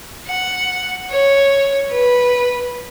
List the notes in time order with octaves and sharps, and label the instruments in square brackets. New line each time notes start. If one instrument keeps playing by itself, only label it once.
[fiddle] F#5
C#5
B4